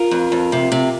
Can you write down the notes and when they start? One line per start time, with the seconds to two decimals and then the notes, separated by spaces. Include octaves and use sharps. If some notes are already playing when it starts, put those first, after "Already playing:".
Already playing: F4 A#4
0.11 F2
0.32 F2
0.52 C3
0.72 C3